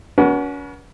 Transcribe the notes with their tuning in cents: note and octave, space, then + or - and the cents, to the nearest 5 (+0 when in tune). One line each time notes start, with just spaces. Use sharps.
C#4 +40 F#4 +0 B4 -40